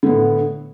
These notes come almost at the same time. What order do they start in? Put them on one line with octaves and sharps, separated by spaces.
D3 B3 A2